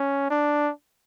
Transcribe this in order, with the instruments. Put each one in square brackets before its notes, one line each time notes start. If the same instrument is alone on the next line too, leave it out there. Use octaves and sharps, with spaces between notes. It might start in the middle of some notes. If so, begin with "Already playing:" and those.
Already playing: [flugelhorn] C#4
D4